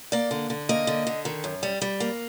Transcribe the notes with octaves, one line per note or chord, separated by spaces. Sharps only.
A#3 D5
D3
D3
A#3 D#5
D3
D3
D#3
F#2
G3
G3
A#3